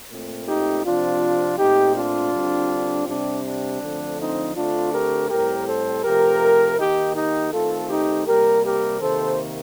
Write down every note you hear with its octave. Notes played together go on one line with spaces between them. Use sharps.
A#2 A3 C4
D#4 G4
C3 F3 C4 D4 F4
A#2 A3 C4 D#4 G4
D4 F4
D3 G3 C4
C3 G3 C4 D4
D4
D3 F3 A3 C4
C4 D#4
D3 A3 C4 D4 F4
G4 A#4
A2 G3 C4 G4 A#4
A4 C5
C3 F3 A3 G4 A#4
D#3 A#3 D#4 G4
D#4 G4
D#3 A3 C4 F4 A4
D#4 G4
C3 G3 A#3 G4 A#4
G4 A#4
C3 D#3 A#3 A4 C5